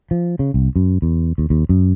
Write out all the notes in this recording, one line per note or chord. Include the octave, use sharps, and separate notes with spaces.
F3
C#3
C2
F#2
E2
D#2
D#2
F#2